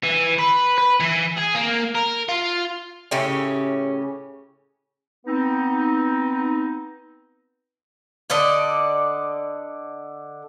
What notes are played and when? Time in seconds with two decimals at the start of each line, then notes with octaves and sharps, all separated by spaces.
0.03 E3
0.39 B4
0.78 B4
1.00 E3
1.37 G#4
1.54 A#3
1.95 A#4
2.29 F4
3.11 A2 C#3 C#4 G4
5.26 B3 C4 D#4
8.30 D3 A4 D5 D#5